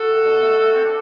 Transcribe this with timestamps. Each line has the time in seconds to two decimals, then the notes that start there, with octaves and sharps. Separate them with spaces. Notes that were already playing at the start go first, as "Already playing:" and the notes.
Already playing: F#4 A4
0.10 A2
0.26 B2
0.43 A3
0.59 A3
0.75 A3 C4
0.85 D4